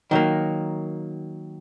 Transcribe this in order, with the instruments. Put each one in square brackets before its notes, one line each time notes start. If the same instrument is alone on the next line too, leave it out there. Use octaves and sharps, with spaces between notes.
[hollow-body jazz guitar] D#3 F#3 A#3